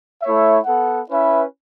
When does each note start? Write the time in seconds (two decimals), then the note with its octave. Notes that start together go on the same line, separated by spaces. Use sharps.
0.22 A3 E4 C#5 E5
0.65 B3 A4 F#5
1.09 C#4 E4 B4 E5